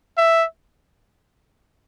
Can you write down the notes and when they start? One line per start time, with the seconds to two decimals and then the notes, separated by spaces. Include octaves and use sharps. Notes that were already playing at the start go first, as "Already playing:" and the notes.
0.17 E5